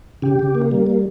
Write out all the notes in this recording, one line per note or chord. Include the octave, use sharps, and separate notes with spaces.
C#3 G4
C#3
A#3
G3
A#3